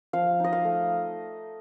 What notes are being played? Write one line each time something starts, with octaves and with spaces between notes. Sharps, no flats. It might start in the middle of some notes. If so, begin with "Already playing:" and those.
F3 F5
D#4 D#5
F5
A3